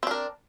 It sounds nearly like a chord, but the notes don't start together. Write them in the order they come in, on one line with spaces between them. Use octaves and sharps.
C4 D4 A#4